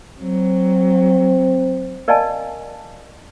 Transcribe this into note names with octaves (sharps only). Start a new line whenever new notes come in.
F#3 C4
A#4 D5 D#5 F5 G#5 A5